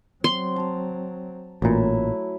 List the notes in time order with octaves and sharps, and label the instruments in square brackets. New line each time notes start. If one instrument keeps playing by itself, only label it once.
[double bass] F#3 C4 [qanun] C6
[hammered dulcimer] A5 A#5
[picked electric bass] A1 A#2 [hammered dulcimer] F#3 E4 [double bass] A3